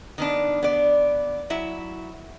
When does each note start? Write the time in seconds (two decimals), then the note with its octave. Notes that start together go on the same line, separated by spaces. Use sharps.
0.18 D#3 B3 D4
0.63 B3 D5
1.50 F#3 E4 E5